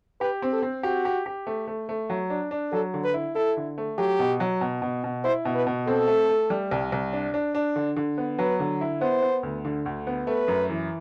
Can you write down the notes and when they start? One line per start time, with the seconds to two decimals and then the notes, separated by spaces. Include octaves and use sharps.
0.20 G4 B4
0.42 C4
0.53 A4
0.62 C4
0.83 F#4 G4
1.05 G4
1.26 G4
1.47 A3
1.67 A3
1.89 A3
2.10 F#3
2.30 D4
2.51 D4
2.72 F#3 A4
2.94 D3
3.04 B4
3.14 E4
3.35 E4 A4
3.57 D3
3.78 A3
3.98 F#3 G4
4.19 B2
4.40 F#3
4.61 B2
4.82 B2
5.04 B2
5.24 E4 C5
5.45 B2
5.55 B4
5.67 B2
5.87 C4 A4
6.07 A3
6.29 A3
6.50 G3
6.71 C2
6.92 C2
7.13 D4
7.34 D4
7.55 D4
7.76 D3
7.96 D3
8.18 B3
8.39 F#3 B4
8.60 D3
8.81 E4
9.01 B3 C5
9.22 B3
9.43 D2
9.65 D3
9.86 D2
10.07 B3
10.27 A3 B4
10.48 F#2
10.69 E3